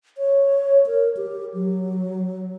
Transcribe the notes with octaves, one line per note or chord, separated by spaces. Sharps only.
C#5
A#4
G4
F#3